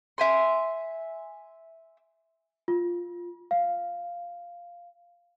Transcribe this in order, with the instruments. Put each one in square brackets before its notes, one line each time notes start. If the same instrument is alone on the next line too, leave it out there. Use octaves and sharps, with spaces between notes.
[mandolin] E5 G#5 C6
[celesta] F4
F5